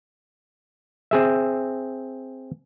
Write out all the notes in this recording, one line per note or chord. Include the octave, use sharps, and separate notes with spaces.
C4 G#4 E5